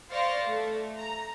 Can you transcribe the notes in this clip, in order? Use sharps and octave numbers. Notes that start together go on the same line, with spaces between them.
C5 D5 F5 C6 C#6 A#6
A3
A#5